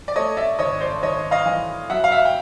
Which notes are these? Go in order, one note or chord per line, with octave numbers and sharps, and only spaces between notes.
D5
A3 C#5 D#5
D5 E5
G#1 C#5 D#5
C5 D5
G#1 C#5 D#5
D#5 F5
E3
F#3 E5 F#5
F5
E5 F#5
G5